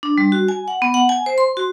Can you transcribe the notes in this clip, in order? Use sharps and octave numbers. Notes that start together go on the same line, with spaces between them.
D4
G3
F#4
G#5
F#5
B3
F#5
G#5
C5
C6
F#4